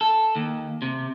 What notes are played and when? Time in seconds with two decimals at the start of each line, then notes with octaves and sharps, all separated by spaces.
0.01 A4
0.36 D#2
0.82 C3